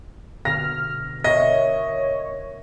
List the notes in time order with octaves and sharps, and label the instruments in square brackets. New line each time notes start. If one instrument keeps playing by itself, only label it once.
[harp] B2 D3 [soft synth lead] F6 [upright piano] A#6
[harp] A#4 E5 F#5 [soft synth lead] C#5 [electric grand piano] D#5 [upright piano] A#6